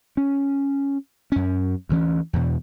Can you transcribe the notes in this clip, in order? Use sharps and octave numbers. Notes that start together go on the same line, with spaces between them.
C#4
F#2 C#4
D2 E3 C#4
E2 B2